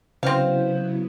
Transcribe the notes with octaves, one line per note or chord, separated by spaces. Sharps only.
C#3 F#3 B3 C4 E4 C5 F5